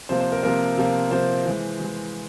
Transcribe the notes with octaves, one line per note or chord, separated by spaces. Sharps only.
C3 F3 A#3 C5
C5
A#4
C3 F3 A#3 A#4
C3 F3 A#3
C3 F3 A#3 C5
E3 G#3
E3 G#3